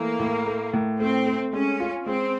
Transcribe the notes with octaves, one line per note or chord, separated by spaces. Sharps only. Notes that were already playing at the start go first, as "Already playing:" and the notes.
Already playing: E3 A3 A#3
A2
A3
A2
A3 C4
A3
G#3 C#4
F4
G#3 C4